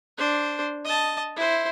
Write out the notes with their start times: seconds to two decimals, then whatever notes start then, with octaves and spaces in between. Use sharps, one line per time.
0.18 D4 C5
0.85 D#5 A5
1.36 E4 C5